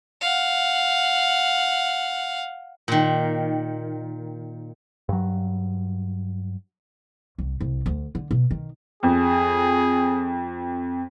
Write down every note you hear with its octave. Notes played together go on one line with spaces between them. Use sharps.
F5 F#5
A#2 D#3
G2 F#3
C2
C2
D2
D3
B2
D#3
F2 G#4